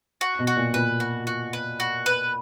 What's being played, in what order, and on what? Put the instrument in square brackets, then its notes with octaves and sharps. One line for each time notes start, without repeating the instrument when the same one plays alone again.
[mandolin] F#4
[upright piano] B2
[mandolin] F#4
[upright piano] A#2
[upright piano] A#2 [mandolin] B4
[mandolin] F#4
F#4
B4
F#4
B4